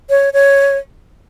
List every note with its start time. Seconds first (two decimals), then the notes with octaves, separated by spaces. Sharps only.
0.10 C#5
0.33 C#5